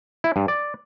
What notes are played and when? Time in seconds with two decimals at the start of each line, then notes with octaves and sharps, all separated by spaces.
0.24 E4
0.36 G2
0.48 D5